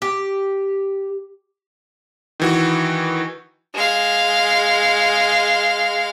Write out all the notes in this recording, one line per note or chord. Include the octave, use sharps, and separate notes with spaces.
G4
D#3 E3 F#4
G#3 F5